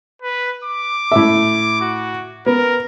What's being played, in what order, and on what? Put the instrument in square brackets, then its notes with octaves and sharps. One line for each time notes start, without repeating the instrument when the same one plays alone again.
[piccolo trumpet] B4
D6
[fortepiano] A2 E5
[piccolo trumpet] F#4
[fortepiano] B3 [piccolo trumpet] A#4